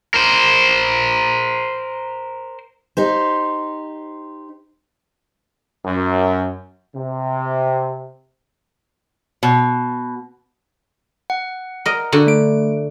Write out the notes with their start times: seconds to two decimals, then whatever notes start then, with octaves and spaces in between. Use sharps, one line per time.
0.14 A#4 C5
2.97 D#4 G4 C5
5.85 F#2
6.95 C3
9.43 B2
11.30 F#5
11.86 A#4 D#5
12.12 D3 F#4
12.27 A3 D7